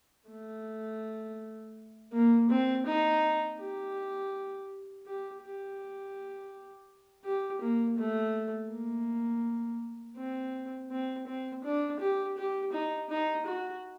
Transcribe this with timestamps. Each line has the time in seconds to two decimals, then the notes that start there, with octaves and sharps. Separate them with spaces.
0.30 A3
2.13 A#3
2.49 C4
2.86 D#4
3.59 G4
5.06 G4
5.42 G4
7.25 G4
7.62 A#3
7.98 A3
8.71 A#3
10.17 C4
10.91 C4
11.27 C4
11.64 D4
12.00 G4
12.37 G4
12.73 D#4
13.10 D#4
13.46 F#4